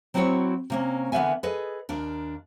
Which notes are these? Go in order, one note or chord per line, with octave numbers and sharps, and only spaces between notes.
F#3 C4 E4 F#4 C5 C#5
C3 A#3 C#4
D3 E3 B3 A#4 E5 G#5
G#4 A4 B4 D#5
D#2 D4 A#4